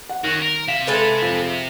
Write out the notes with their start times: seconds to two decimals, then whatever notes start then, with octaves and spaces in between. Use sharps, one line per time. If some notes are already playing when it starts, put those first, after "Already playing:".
0.09 F#5
0.24 D#3 C#4 F#4
0.42 A#4
0.68 C3 E5 F5
0.87 G#3 A4 B4
1.22 F2